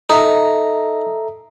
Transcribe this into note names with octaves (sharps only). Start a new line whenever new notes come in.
D#4 A4 E5 A#5